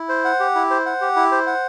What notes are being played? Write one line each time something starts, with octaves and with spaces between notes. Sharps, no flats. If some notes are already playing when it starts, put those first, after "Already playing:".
Already playing: E4
C5
F#5
G4
E4
C5
F#5
G4
E4
C5
F#5